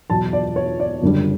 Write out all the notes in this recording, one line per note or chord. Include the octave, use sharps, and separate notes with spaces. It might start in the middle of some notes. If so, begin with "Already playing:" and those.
E2 B2 F#3 A5
D5
C#5
D5
F#1 F#2 D3 G3